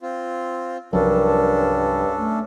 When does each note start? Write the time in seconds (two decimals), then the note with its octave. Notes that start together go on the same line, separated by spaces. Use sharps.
0.01 C4 F4
0.93 C2 G2 F3 F#3 C#4 D4 A4 A#4
2.18 A3